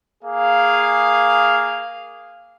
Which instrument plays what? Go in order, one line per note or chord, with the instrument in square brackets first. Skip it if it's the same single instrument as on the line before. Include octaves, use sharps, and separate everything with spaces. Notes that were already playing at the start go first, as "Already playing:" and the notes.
[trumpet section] A#3 G#4 F5